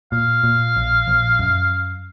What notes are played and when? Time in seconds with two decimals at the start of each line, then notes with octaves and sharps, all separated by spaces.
0.12 A#2 F5
0.44 A#2
0.76 A#1
1.08 A#1
1.39 F#2